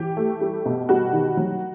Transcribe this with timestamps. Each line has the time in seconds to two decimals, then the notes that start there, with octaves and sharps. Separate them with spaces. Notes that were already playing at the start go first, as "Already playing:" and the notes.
Already playing: E3 G4
0.17 A3
0.41 G3
0.66 B2
0.89 G3 F#4
1.13 D#3
1.37 F#3